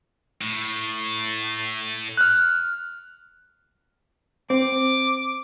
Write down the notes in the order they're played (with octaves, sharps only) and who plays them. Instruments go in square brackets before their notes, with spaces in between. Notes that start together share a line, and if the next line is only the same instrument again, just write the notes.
[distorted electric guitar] A2
[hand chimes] F6 F#6
[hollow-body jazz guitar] C4 [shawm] D6